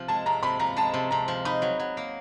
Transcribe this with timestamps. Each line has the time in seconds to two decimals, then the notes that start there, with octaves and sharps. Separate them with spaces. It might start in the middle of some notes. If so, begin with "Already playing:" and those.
Already playing: C3 F3
0.08 G#3 A5
0.26 C3 A#5
0.43 C3 B5
0.59 F3 A#5
0.77 G#3 A5
0.94 C3
1.11 C3 A#5
1.28 F3
1.45 D#4 B5
1.62 F#3
1.79 F#3
1.97 A#3